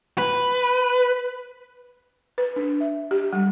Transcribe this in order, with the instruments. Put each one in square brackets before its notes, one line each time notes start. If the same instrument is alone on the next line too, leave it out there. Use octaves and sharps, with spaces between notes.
[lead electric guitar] B4
[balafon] B4
D4
E5
G4
G3